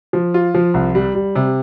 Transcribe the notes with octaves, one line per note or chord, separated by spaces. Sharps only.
F3
F4
F3
C2
G3
G3
C3